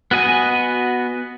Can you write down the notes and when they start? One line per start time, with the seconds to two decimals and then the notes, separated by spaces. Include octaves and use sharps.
0.11 B3 F#4 D#5 G#5